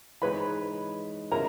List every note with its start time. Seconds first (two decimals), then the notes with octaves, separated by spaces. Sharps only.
0.22 E3 G#3 D#4 G#4 B4 C#5 B5
1.31 G#3 C#4 E4 A#4 A#5